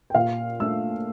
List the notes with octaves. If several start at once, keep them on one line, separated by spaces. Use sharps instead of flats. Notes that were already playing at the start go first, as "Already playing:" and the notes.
G5
A#2 F5
A3 D4 E6